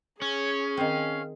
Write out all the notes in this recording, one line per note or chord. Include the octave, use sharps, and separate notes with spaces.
C#4 G#4 C#5
D#3 C4 F5